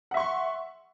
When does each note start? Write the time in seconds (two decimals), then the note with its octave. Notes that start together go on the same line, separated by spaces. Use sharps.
0.11 F#5
0.14 E5
0.17 C#6
0.20 C6